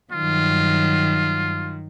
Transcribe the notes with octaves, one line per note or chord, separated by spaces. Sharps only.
G2 D#3 F#3 F4